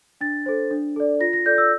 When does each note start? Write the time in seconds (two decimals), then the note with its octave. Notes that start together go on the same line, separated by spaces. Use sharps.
0.21 D4 A6
0.46 A4 C5
0.71 D4
0.96 A4 D5
1.20 F4 A#6
1.33 A#6
1.46 A4 D5 G6
1.58 E6